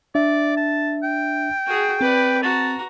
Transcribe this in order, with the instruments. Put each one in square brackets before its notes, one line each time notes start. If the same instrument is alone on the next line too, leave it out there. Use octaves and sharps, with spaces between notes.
[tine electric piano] D4 E5 [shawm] D5
[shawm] A5
G5
[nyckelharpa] F#4 G#4
[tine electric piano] C4 [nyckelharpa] B4 D5
[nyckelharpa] F#4 A#5 [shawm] A5